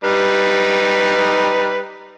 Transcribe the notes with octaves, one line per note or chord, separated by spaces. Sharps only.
G3 D#4 B4